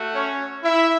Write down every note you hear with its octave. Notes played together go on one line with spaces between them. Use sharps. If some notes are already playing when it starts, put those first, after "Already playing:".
Already playing: A3 F#4
C#4 C#5
E4 E5